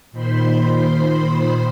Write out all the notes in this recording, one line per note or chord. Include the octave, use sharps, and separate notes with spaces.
A#2 D#3 C5 B5 C6